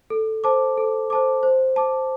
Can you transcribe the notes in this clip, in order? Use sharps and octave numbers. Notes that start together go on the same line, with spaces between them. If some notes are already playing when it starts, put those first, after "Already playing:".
A4
C5 A5 D6
A4
C5 A5 D6
C5
A5 D6